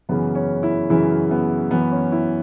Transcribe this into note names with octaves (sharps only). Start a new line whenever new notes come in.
F#2 C#3 E3 B3
C#4
E4
F#2 C#3 E3 E4
B3
F#2 E3 B3
C#4
E4